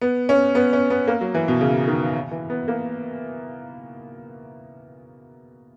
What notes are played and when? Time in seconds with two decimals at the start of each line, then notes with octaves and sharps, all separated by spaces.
0.01 B3
0.29 C#4
0.55 B3
0.73 C#4
0.90 B3
1.08 A#3
1.21 F#3
1.34 E3
1.48 B2
1.61 C#3
1.88 D#3
2.31 E3
2.50 B3
2.68 A#3